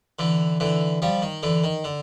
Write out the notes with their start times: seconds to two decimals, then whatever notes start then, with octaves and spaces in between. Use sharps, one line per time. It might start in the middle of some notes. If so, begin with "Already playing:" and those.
0.19 D3 E3
0.60 D3 E3
1.02 F3 G3
1.22 D#3
1.43 D3 E3
1.64 D#3
1.84 D3